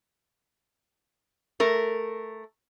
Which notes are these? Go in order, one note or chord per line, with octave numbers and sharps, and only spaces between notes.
A3 A#4